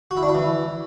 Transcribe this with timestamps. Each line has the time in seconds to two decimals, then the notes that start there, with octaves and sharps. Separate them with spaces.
0.11 F#4
0.17 E4
0.23 D4
0.29 E4
0.35 E3